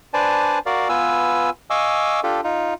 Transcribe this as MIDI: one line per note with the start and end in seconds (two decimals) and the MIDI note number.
0.14 0.59 62
0.14 0.59 71
0.14 0.59 72
0.14 0.59 74
0.14 0.59 80
0.14 0.59 81
0.66 0.88 66
0.66 0.88 70
0.66 0.88 74
0.66 0.88 77
0.89 1.50 59
0.89 1.50 65
0.89 1.50 71
0.89 1.50 80
0.89 1.50 88
1.70 2.20 75
1.70 2.20 77
1.70 2.20 80
1.70 2.20 85
1.70 2.20 86
1.70 2.20 88
2.23 2.41 62
2.23 2.41 65
2.23 2.41 67
2.23 2.41 69
2.44 2.74 63
2.44 2.74 65